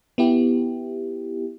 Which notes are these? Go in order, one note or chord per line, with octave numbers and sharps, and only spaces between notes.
B3 E4 G4